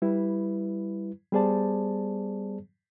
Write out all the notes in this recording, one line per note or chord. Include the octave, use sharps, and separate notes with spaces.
G3 E4 B4
G3 B3 G#4 C5 D5 A5